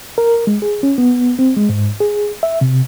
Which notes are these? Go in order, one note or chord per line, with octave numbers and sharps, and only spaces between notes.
A#4
G#3
G#4
C#4
B3
C4
G#3
G#2
G#4
E5
C3